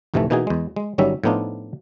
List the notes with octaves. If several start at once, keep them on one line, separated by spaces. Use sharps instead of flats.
A1 F2 C3 D#3 E3 A3
B2 E3 A#3 D#4 F#4 G#4
E2 G#3
G#3
G1 D#3 F#3 G3 C#4 E5
A2 F3 B3 D4 D#4 F4